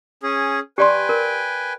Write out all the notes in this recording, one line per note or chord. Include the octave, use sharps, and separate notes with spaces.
C#4 G#4
G4 B4 D5 G5 G#5 C6
A#4